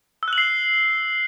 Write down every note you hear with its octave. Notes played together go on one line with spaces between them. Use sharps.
E6
F#6
F#7
C7